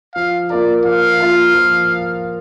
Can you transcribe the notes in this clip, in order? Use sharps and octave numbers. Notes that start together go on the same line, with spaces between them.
F3 F5
A#3 F4 A#4 D5
F3 F5
A#3 F4 A#4
F3